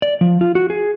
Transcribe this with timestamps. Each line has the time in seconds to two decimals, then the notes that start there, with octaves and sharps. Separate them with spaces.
0.02 D5
0.21 F3
0.41 F4
0.55 F#4
0.70 G#4